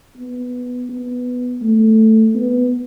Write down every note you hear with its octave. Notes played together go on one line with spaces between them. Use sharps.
B3
B3
A3
B3